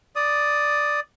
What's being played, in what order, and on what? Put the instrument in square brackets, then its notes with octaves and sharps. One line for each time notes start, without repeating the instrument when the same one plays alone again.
[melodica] D5 D#6